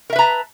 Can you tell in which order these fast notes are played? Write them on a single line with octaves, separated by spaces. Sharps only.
A#4 E5 B4 A#5 A5